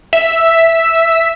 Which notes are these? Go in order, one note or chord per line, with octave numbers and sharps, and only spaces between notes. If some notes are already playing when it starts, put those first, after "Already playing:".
E5